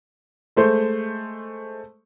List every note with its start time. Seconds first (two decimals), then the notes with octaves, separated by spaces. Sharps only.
0.57 G#3 A3 C5